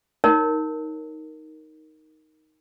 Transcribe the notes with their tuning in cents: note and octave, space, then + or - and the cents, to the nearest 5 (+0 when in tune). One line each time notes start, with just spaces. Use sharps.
D#4 +10 A#4 +0 C#5 +0